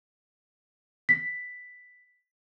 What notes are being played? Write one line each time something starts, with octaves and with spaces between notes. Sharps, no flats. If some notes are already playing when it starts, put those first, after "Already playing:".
B6